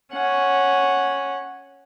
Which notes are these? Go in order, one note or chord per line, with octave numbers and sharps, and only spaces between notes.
C#4 F#5